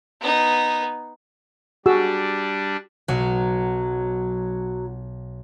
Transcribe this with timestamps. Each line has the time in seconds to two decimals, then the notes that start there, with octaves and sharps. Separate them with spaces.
0.21 B3 D#4
1.86 G3 D4 F#4 G#4 E6
3.08 B1 F#3